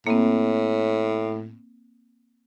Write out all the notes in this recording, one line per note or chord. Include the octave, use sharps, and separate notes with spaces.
A2 A#3 C4